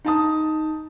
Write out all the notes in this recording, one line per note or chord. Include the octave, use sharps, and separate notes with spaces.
D#4 A5 D#6